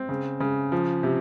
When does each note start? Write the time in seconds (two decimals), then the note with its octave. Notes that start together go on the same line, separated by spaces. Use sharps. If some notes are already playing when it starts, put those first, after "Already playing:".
Already playing: C4
0.09 C#3
0.40 C#3
0.72 F3
1.03 C3